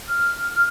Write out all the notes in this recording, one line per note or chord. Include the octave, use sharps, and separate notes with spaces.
F6